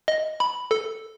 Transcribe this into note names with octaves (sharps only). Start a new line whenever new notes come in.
D#5
B5
A4